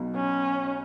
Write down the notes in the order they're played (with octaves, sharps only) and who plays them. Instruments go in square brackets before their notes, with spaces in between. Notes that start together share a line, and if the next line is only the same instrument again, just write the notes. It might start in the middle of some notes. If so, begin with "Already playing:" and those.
Already playing: [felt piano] B1 B2
[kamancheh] C#4